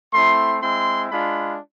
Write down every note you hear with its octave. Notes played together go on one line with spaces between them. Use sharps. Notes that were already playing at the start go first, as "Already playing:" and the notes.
A3 C4 E4 C6
G#3 C4 E4 C6
G#3 D4 F4 B5